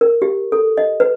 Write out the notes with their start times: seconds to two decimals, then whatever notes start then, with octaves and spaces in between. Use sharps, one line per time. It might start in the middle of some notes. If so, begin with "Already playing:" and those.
0.01 A#4
0.22 G4
0.52 A4
0.78 D#5
1.00 B4